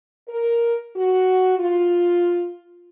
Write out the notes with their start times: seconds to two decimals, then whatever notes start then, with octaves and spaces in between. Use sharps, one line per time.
0.29 A#4
0.96 F#4
1.59 F4